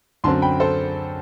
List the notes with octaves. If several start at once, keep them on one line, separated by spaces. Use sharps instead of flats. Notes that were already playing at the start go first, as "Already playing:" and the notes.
F#2 D3 F#3 C4 A5 C6
G5 B5
A4 C5